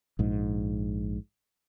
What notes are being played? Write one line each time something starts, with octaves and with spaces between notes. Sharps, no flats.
A#1 G#2